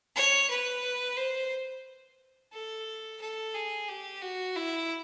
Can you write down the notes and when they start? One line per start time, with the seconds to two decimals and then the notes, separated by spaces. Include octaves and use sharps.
0.16 C#5
0.50 B4
1.17 C5
2.53 A4
3.21 A4
3.54 G#4
3.88 G4
4.22 F#4
4.56 E4